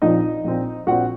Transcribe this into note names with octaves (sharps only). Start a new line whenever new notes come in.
A#1 A#2 F3 C4 D#4 D#5
A#1 A#2 F3 C4
A#1 A#2 F3 C4 F#4 F#5